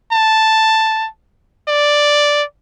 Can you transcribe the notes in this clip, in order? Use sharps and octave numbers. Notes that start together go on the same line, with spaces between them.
A5
D5